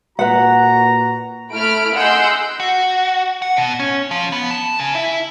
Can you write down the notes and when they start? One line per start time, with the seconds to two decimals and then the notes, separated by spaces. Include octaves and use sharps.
0.19 A#2 F#4 B4 F#5 A#5
1.53 A3 E4 B5 F6 D7
1.94 G#4 D#5 F#5 C6 E6 G6
2.60 F#4
3.42 F#5
3.57 B2
3.79 C#4
4.11 F3
4.32 B3
4.51 A5
4.80 C#3
4.95 E4